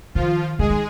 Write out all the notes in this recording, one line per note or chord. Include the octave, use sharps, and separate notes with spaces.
D#3 F3 F4
D#3 G#3 G#4
D#4